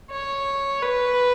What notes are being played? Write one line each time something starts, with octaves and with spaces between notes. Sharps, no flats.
C#5
B4